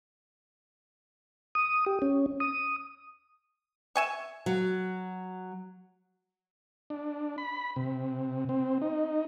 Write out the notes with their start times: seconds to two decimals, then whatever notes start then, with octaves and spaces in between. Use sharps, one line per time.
1.55 D#6
1.86 G4
2.02 C#4
2.40 D#6
3.96 E5 G#5 C#6
4.46 F#3
6.90 D4
7.38 B5
7.76 C3
8.49 C4
8.82 D#4